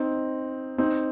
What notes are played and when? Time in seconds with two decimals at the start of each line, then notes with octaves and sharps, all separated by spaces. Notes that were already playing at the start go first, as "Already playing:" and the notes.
Already playing: C4 D#4
0.78 C4 D#4